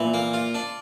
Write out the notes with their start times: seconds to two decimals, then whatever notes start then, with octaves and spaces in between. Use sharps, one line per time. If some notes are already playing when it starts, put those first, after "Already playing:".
Already playing: A#2 E3
0.14 A#3
0.33 F4
0.54 D4